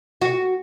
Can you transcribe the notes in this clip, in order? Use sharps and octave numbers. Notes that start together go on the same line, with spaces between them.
F#4